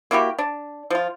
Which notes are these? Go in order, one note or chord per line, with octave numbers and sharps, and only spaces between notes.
A#3 E4 F#4 G4
D4
F3 F4